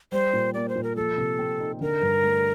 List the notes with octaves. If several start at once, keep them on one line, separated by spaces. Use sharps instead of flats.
G3 C5
A#2
A#3 D5
C5
A#2
A#4
F3 A4
C3
C4
D#4
D3 A#4
G2
A3